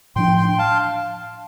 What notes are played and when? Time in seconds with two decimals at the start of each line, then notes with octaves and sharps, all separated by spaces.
0.16 A2 F3 D4 G5 C6
0.37 G5 C6
0.49 G5
0.59 F5 A5